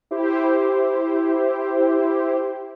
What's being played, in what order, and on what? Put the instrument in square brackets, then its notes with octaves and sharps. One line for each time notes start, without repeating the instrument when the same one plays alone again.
[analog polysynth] E4 G4 C5